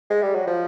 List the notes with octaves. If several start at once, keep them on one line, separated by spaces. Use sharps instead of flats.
G#3
G3
F#3
F3